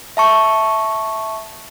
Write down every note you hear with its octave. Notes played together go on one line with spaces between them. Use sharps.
E5 A5 C#6